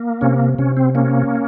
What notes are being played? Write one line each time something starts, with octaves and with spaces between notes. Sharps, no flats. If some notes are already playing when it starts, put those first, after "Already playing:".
Already playing: A#3
C3 C#4
C3 C#4
C4
A#3 C#4